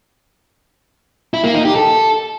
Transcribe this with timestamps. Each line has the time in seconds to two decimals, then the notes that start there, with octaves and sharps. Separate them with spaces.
1.34 E4
1.44 A#3
1.55 D#4
1.65 G4
1.75 A4